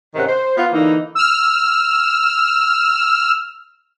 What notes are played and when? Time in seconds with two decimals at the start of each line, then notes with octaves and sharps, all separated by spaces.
0.15 G#2 C3 D#3 C#4 F#5
0.28 C5
0.56 B3 F4
0.72 D3 E3 A#3 D#4
1.15 E6 F6